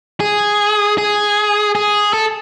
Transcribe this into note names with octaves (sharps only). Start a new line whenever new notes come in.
G#4
G#4
G#4
A4